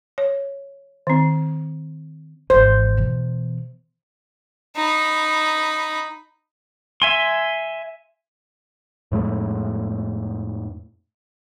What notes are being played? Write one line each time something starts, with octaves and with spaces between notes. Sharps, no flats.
C#5
D#3 C4
G#1 E3 C5
B2 E3
D#4 B5
E5 G#5 C6
F2 A2 G#3 A3